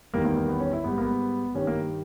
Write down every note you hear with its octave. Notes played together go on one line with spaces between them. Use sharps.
E2 D#3 G3 A#3
A#3
A#3
B3
C#4
E4
G#2 G3 B3
A#3
B3
G2 D#3 G3 C#4
A#3